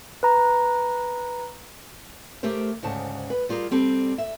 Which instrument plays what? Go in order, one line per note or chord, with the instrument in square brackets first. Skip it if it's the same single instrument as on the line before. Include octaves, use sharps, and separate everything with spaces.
[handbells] B4 A#5
[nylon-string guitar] A3 G4 A#4 C5
D2 G#2 C#3 A5
B4
G3 F4 G#4 A#4
G3 C4 G4 A4
E5